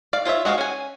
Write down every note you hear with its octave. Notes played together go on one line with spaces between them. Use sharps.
D5 F5
F4 C5 C#5 E5
G#3 F#4 G#4 F5
C#4 G#5